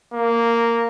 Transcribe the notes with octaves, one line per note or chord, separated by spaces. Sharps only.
A#3